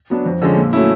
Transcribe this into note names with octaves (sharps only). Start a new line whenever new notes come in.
F#3 B3 D4
F2
D3 F3 G#3 C#4
A#2
F#3 A3 C#4 E4